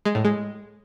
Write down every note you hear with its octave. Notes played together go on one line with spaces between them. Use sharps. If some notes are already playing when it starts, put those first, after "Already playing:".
G#3
A2
G#3